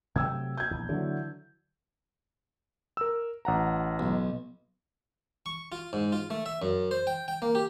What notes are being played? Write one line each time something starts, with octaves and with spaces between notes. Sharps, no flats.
C3 F#3 A3 G5 E6 G#6
G6 G#6
A#1 E2
D3 E3 F#3
A#4 E6
A1 F#5 A#5
B1
C#6
F4
G#2
F4
A3
E5
F#2
C5
G5
G5
A#3
G4